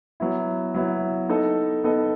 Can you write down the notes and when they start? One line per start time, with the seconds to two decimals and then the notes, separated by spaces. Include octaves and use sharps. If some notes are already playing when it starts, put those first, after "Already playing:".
0.20 F#3 B3 E4
0.74 F#3 B3 E4
1.29 B3 D#4 A4 D#5
1.84 B3 D#4 A4 D#5